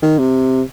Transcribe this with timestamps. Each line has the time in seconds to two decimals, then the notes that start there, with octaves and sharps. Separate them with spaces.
0.02 D#3
0.19 C3